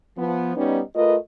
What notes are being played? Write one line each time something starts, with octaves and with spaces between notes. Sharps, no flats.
F3 B3
G3 B3 C#4 D#4
A3 F4 A#4 B4 D#5